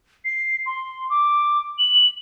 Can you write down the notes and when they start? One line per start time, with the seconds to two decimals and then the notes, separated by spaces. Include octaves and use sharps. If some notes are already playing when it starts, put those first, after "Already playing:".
0.25 C7
0.66 C6
1.10 D6
1.78 F#7